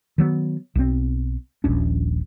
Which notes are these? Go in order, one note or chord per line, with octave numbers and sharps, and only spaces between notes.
D#3 F#3 B3
B1 C4
D#1 A#1 C#4 D4